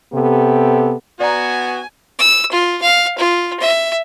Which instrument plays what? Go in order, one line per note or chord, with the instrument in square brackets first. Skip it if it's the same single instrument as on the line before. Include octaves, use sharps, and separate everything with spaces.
[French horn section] C3 B3 G4 A4
[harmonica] B3 F#4 [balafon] D5 A#5 [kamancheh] G#5
[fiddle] E6
F4
F5
F4
E5